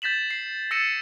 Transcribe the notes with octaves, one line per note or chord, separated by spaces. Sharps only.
G6 A6 B6 E7 F#7
C7
E6 A6 A#6 C#7 D#7 E7